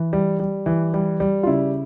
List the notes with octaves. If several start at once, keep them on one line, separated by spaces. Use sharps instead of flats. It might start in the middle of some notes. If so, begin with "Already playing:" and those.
Already playing: E3
G3
G3
E3
G3
G3
F4
C#3 E4